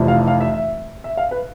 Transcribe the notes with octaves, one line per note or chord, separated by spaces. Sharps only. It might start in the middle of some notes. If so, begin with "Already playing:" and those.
Already playing: F1 F2 C3 E3
F5
F5
E5
E5
E5
F5
B4